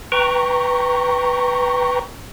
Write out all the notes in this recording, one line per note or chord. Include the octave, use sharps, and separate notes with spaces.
B4 G5 A#5 C#6